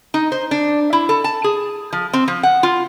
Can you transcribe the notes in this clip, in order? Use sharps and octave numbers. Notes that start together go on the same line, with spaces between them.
D#4
C5
D4
E4
A4
A5
G#4
F3
C4
F3
F#5
F4